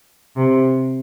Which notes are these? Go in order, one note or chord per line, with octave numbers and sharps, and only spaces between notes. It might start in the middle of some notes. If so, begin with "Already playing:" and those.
C3